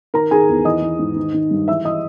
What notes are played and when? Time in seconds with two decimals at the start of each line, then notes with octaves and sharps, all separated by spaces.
0.14 D#3 A#4 A#5
0.31 D#3 G#4 G#5
0.49 E2
0.65 E3 D#5 D#6
0.82 E3
0.99 G#2
1.16 D#3
1.34 D#3
1.51 G2
1.68 E3 E5 E6
1.85 E3 D#5 D#6